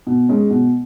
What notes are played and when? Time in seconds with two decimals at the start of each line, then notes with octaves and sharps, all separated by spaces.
0.07 B2
0.29 G#3 C#4
0.50 B2